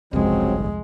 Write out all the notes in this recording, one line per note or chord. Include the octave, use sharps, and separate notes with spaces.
G1 C2 F2 C#3 F#3 G#3 C4